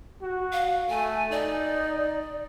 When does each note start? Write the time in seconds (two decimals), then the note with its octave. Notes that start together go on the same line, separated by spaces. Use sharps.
0.22 F#4
0.52 F5
0.89 A3 G#5
1.31 D#4 D5